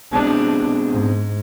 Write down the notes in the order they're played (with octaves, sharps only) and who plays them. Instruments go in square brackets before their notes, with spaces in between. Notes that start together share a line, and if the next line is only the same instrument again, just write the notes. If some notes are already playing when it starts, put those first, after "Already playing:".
[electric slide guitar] B2 G#3 C4 [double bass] D4
[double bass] G#2